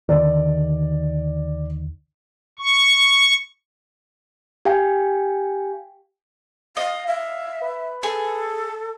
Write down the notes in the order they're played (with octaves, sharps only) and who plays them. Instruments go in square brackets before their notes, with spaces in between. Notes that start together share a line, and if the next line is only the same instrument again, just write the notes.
[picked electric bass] D#2 D3 D#3 [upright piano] D5
[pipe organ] C#6
[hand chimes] G4 F5 G5 G#5
[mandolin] D#5 [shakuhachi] F5
[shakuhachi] E5 [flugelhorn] F5
[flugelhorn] B4
[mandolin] G#4 [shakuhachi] A4